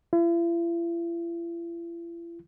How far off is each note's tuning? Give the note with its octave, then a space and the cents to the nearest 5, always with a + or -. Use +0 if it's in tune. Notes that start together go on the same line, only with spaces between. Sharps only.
E4 +45